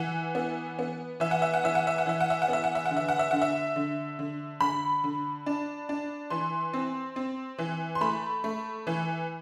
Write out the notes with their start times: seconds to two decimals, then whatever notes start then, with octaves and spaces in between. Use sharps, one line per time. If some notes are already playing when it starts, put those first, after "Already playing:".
Already playing: E3 F#5
0.35 B3
0.79 B3
1.20 E3 E5
1.31 F#5
1.42 E5
1.54 F#5
1.64 E3 E5
1.75 F#5
1.87 E5
1.98 F#5
2.06 E3 E5
2.20 F#5
2.30 E5
2.42 F#5
2.48 B3 E5
2.64 F#5
2.75 E5
2.85 F#5
2.91 D3
2.97 E5
3.08 F#5
3.19 E5
3.31 D3 F#5
3.42 E5
3.76 D3
4.19 D3
4.60 D3 B5
5.04 D3
5.46 D4
5.89 D4
6.30 E3 C6
6.73 C4
7.16 C4
7.58 E3
7.95 C6
8.01 A3 B5
8.44 A3
8.87 E3